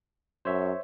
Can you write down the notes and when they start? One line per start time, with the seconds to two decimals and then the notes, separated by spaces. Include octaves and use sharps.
0.45 F#2 C5 C#5 E5